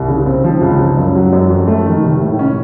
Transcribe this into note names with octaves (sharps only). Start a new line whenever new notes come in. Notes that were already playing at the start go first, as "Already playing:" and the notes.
Already playing: C2
C#3
C4
F3
C#2
C#3
F#2
F#3
F#2
F2
A3
D#3
F1
A2
C#4